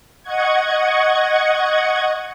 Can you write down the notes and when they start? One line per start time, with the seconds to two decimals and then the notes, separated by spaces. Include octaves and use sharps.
0.23 D#5 F#5 C#6 G#6